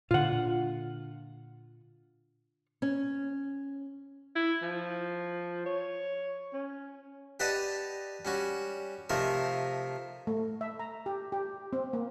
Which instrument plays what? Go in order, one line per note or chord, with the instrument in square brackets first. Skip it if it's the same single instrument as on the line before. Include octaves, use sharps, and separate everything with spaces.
[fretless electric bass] A#2 D3 [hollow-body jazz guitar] F4 F#5
[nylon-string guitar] C#4
[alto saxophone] E4
F3
C#5
C#4
[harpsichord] G4 B4 D5 D#5 F#5 A5
G3 C#4 F#4
C3 F3 A3 D#4 A#4
[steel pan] A3
E5
A#5
G4
G4
C4
A#3